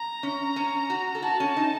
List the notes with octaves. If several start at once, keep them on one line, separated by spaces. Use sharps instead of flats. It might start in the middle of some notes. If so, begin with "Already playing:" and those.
Already playing: A#5
C#4
C#4
F#4
A4
F#4 A5
C#4
D#4